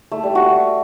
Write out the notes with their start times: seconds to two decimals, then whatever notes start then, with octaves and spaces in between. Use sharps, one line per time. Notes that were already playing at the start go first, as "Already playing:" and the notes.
0.12 A3
0.23 G3
0.35 F#4